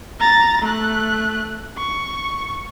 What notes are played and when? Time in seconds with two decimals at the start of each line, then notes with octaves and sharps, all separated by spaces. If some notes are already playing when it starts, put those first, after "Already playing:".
0.20 A#5 A6
0.62 A3 F#6
1.78 C#6